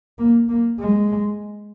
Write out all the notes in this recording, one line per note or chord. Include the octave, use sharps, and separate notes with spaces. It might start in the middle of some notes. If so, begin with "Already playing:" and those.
A#3
A#3
G#3